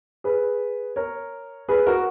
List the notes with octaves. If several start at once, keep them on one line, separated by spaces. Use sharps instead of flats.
G#4 B4
A#4 C#5
G#4 B4
F#4 A#4